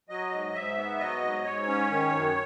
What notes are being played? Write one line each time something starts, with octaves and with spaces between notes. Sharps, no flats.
F#3 D#5
G#2
G#2 E5
B3
F#3 D#5
G#2
G#2 C#5
C#4
D#3
F#2